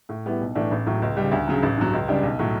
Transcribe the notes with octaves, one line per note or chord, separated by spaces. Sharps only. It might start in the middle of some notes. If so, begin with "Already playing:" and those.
A2
G3 B3 E4
B1
A2 E3 A3 D4
A1
A2 F#3
C#2
C#3 G3
D2
C#3 F#3
A1
G2 F#3
C#2
C#3 G3 D4
B1
A2 F#3